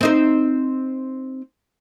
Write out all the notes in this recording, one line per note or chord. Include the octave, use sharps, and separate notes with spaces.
C4 D#4 C5